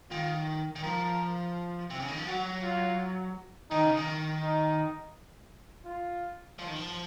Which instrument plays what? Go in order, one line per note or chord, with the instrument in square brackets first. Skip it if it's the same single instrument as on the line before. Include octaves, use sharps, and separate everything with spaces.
[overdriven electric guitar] D#3 [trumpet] F4
[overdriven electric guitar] D#3
[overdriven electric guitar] F3 [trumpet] A#4
[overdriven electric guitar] C3
C#3
D#3
F3
[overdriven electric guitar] F#3 [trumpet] F#4
[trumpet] F4
[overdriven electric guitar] D#3 [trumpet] D#4
[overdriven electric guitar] C#3
D#3
[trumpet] D#4
F4
[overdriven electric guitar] F3
D#3
F3